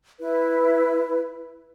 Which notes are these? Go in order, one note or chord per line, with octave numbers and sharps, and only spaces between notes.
E4 B4